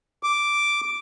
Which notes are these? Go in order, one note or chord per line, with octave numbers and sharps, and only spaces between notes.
D6